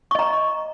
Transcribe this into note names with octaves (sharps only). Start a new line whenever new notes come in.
D#5 A#5 C#6